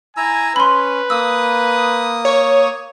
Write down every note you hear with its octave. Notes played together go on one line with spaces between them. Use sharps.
E4 G#5 A#5 E6
C#4 B4 B5 C6
A#3 D#6 E6
C#5